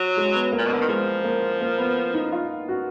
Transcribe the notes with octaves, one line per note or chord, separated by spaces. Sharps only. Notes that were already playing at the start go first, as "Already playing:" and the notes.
Already playing: F#3
G#3
B3
A#3
A#2
B2
D3 B3
D#3
F3 G#3
A#3
A#3
B3
D#4
F4
F#4